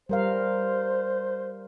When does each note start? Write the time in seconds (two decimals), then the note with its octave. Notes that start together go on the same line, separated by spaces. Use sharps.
0.09 G3 A#4 C5 F5